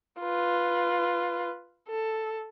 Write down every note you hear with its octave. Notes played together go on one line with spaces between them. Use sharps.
F4 B4
A4